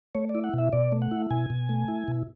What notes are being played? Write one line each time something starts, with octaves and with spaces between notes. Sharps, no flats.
A3 C#5
D5
E4
F#5
B2 E5
B2 D5
A3
F#5
E4
B2 G#5
B2
A3
E4
B2